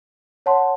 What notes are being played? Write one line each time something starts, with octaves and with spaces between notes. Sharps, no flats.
C#5 F#5 A5 C6